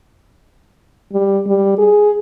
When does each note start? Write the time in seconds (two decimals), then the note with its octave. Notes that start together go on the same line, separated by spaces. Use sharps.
1.13 G3
1.47 G3
1.78 G#4